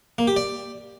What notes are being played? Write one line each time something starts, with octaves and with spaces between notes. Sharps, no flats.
A#3
G4
D5